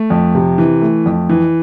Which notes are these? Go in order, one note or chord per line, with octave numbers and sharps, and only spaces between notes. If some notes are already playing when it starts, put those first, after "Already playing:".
Already playing: A3
F2
C3
E3
A3
F2
E3